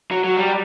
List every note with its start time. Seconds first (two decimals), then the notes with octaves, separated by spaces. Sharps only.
0.11 F#3
0.24 F#3
0.37 G3